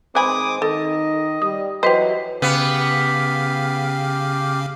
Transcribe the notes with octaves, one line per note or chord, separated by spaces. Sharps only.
D#3 G#3 C4 B4 G#5 B5 D6 D#6
D#3 A4 D#5
G3 D#6
E3 F#3 G4 B4 C5 D#5
C#3 B3 G4 F5